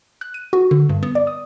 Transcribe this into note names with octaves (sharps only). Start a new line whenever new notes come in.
F#6
D#7
F#4
D3
G2
B3
D5
D#6